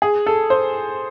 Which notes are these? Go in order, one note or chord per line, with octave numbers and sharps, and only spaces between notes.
G#4
A4
C5